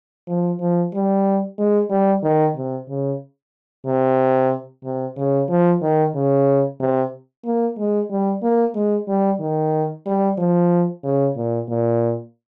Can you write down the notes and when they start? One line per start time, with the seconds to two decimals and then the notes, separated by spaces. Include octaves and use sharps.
0.28 F3
0.60 F3
0.93 G3
1.58 G#3
1.90 G3
2.23 D#3
2.56 C3
2.89 C#3
3.86 C3
4.84 C3
5.17 C#3
5.49 F3
5.82 D#3
6.15 C#3
6.80 C3
7.45 A#3
7.78 G#3
8.10 G3
8.42 A#3
8.75 G#3
9.08 G3
9.40 D#3
10.06 G3
10.38 F3
11.04 C#3
11.36 A#2
11.68 A#2